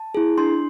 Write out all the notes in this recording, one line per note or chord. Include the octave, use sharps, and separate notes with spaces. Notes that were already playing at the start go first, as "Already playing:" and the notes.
Already playing: A5
E4 G#4
D4 C6